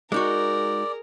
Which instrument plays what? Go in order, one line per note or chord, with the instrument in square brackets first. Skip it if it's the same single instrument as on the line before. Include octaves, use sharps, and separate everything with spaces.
[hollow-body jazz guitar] G#3 D#4 F#4 [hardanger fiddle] G#4 A#4 [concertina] D5